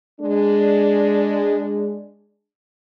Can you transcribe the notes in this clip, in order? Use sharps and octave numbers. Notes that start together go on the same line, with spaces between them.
G#3 D4